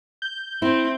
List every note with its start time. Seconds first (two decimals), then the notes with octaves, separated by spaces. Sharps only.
0.22 G6
0.62 C4 E4